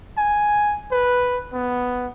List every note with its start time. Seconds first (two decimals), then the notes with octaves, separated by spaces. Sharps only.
0.18 G#5
0.92 B4
1.53 B3